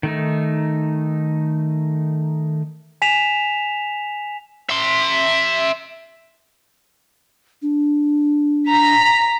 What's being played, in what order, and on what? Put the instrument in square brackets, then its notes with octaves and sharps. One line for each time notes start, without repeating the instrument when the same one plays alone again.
[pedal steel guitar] D#3 A3 D#4
[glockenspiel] G#5 B6 E7 F7
[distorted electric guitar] E5 C6
[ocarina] D4
[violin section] A#5 B6